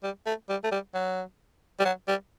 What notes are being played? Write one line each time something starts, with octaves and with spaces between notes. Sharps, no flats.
G3
A3
G3
A3
G3
F#3
G3
F#3
G3